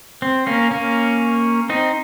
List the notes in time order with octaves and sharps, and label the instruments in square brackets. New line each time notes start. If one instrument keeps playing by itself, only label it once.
[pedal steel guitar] C4
A#3 C#4
A#3 C#4
C4 D#4